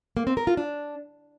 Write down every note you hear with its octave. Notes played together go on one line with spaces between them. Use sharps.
A#3
C4
A#4
F4
D4